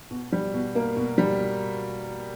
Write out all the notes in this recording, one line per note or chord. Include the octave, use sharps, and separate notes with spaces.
B2
G3
B2
A#3
B2
G3